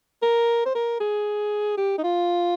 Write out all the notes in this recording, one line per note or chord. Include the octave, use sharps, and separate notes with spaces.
A#4
C5
A#4
G#4
G4
D#4
F4